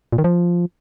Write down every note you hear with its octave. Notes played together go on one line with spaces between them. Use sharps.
A#2
D#3
F3